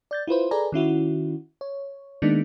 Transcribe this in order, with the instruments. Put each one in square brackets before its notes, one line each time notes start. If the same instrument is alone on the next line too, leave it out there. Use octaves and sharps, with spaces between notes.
[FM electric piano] D5 G6 A6
E4 F4 B4 C5
G#4 A4 B4 D5 G#5 A#5
D#3 C#4 E4 F#4
C#5
D#3 G#3 A#3 B3 D4 D#4